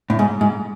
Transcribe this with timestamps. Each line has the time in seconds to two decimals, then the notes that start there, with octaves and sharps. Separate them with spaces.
0.10 A2
0.19 G#2
0.41 G#2